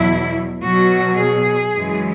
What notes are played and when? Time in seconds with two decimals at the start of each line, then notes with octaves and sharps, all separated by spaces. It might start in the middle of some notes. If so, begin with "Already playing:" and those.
Already playing: E2 B2 F#3 E4
0.61 B2 F#3 F#4
1.16 G#4
1.72 F#2 E3 G#3